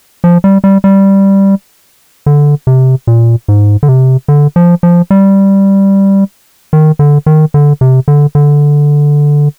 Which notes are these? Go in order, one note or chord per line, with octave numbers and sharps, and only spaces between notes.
F3
G3
G3
G3
D3
C3
A#2
G#2
D3
C3
D3
F3
F3
G3
D#3
D3
D#3
D3
C3
D3
D3